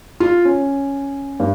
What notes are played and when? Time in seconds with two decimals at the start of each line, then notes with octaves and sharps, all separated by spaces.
0.20 F4
0.45 C#4
1.40 G2